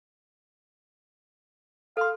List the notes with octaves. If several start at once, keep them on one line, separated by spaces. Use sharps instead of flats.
A4 F5 C6